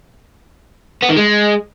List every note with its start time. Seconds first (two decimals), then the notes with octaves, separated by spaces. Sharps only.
1.02 B3
1.09 D#3
1.16 G#3